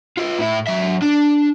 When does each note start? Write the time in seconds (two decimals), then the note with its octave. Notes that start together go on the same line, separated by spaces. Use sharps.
0.18 F4 B4
0.39 A2 E4
0.67 F#3 E5
1.02 D4